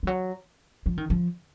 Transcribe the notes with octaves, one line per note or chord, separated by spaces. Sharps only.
F3
F#3
F3
D#3
F3